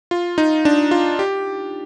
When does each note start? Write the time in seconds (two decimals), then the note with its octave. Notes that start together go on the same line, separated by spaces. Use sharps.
0.11 F4
0.38 D#4
0.65 D4
0.91 F4
1.19 G4